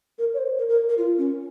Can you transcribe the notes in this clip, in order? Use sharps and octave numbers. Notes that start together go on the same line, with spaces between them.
A#4
C#5
C5
A#4
A#4
A#4
F4
C#4